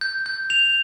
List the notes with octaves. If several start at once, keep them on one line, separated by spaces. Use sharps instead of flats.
G6
G6
F7